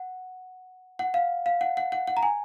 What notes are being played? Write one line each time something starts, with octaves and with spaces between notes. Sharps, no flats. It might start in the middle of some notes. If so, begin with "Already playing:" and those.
Already playing: F#5
F#5
F5
F5
F#5
F#5
F#5
F#5
A#5
G#5